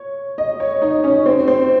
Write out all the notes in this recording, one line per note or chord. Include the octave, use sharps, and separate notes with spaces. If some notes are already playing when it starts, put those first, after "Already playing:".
Already playing: C#5
D#5
C#5
D#4
C#4
C4
C4